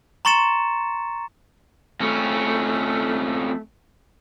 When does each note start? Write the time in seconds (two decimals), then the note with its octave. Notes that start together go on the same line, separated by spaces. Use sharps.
0.25 A#5 C6 C#6 A6 C#7 E7
2.00 F2 A3 C#4